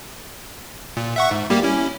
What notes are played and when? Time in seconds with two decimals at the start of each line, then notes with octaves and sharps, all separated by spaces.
0.97 A#2
1.16 E5 F#5 C#6
1.31 G#2
1.50 G3 A#3 G4
1.63 C#4 E4